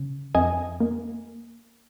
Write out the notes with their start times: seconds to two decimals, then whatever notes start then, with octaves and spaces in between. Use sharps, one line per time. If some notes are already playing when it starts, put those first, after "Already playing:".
Already playing: C#3
0.35 F2 D#5 G#5
0.80 A#3